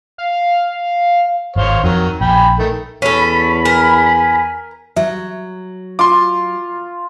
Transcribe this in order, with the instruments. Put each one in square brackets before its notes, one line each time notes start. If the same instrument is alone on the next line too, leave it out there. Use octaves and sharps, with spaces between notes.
[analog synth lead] F5
[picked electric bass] G#1 [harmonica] C5 C#5 F5
[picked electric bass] F2 [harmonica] D#3 F#3
[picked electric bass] A#1 [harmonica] G5 G#5 B5
[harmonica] D#3 A3
[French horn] E2 [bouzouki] C#4 A4 [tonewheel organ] B5
[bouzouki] A#4 [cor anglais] G#5
[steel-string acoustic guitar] F#3 [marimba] E5
[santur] F4 [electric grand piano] C6 D6